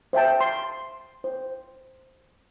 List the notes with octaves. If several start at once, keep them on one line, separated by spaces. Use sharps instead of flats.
C5 E5 G5 A5
C6
C5